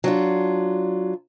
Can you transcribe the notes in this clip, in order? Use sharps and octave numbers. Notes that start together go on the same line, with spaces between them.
F#3 D4 F4